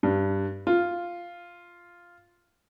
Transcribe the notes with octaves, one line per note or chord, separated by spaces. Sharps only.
G2
F4